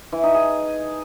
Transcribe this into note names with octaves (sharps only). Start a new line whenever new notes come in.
E3
D#4
G#4